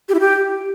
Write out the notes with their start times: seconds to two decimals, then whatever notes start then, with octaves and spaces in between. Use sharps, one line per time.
0.09 G4
0.14 E4
0.20 G4